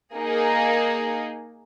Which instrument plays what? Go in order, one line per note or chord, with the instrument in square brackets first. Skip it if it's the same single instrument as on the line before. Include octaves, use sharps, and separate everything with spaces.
[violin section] A#3 D#4 G#4